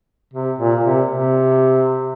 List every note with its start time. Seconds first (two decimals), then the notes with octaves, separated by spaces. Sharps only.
0.34 C3
0.59 A#2
0.84 C3
1.09 C3